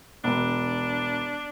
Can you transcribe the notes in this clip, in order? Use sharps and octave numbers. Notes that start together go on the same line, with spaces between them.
E1 D4